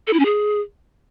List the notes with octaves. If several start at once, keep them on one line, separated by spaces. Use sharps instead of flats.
A4
E4
C#4
G#4